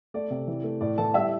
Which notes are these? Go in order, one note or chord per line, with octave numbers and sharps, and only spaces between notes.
A3 D5
C3
E3
A3
A2 D5
E3 A4 A5
G3 E5 E6